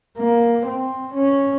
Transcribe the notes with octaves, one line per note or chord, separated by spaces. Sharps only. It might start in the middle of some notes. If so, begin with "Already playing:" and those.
A#3
C4
C#4